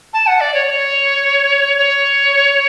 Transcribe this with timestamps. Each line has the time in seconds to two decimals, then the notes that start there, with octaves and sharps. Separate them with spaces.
0.13 A5
0.27 F#5
0.41 D5
0.54 C#5
0.67 D5
0.71 C#5
1.78 C#5